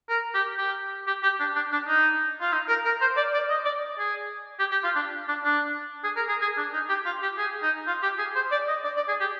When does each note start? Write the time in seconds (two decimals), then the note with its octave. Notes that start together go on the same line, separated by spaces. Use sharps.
0.09 A#4
0.34 G4
0.58 G4
1.07 G4
1.23 G4
1.40 D4
1.55 D4
1.72 D4
1.87 D#4
2.41 F4
2.52 D#4
2.68 A#4
2.85 A#4
3.01 C5
3.16 D5
3.33 D5
3.50 D#5
3.65 D5
3.99 G#4
4.59 G4
4.71 G4
4.84 F4
4.95 D4
5.28 D4
5.44 D4
6.04 G#4
6.16 A#4
6.29 G#4
6.41 G#4
6.57 D4
6.73 D#4
6.89 G4
7.05 F4
7.22 G4
7.38 G#4
7.62 D#4
7.87 F4
8.03 G4
8.19 G#4
8.35 C5
8.51 D5
8.68 D#5
8.84 D5
8.96 D5
9.08 G#4
9.20 G4